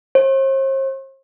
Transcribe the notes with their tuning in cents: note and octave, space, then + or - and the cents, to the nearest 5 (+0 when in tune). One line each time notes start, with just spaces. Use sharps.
C5 +45